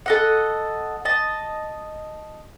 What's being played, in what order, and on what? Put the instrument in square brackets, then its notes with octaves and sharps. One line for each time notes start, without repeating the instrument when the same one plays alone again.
[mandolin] A4 D#5 F#5
D#5 A5